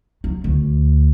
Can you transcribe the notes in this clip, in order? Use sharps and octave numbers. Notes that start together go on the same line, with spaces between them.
F#3
D2